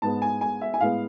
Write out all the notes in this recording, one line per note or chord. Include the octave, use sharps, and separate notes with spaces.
G#2 G#3 B3 A5
G#5
G#5
E5
G#5
A2 G#3 B3 F5